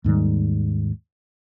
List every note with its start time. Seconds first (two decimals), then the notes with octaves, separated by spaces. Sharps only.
0.04 D#2 G#2 D#3 G3